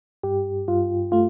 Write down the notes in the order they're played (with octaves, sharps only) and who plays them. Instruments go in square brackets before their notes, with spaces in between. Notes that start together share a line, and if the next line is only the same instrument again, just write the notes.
[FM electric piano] G2 G4
G2 F4
A3 F4